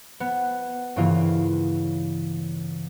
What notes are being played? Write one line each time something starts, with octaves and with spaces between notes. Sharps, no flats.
B3
G2 C#3 E3 A#3 F4